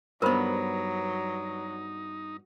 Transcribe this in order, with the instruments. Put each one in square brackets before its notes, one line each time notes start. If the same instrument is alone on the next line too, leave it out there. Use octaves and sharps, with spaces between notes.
[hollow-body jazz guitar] G2 B3 [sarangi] F#3 [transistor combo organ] D#4 [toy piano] A#4 C5 B5